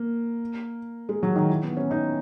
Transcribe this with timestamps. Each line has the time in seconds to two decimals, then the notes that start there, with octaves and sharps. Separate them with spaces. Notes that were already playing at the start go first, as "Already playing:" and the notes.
Already playing: A#3
1.09 G#3
1.23 F#3
1.36 D#3
1.49 E3
1.63 B3
1.77 C#4
1.91 D#4